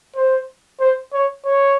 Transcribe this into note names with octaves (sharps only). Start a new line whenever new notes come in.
C5
C5
C#5
C#5